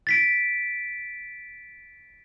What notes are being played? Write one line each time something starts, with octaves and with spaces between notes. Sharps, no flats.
A6 B6 D7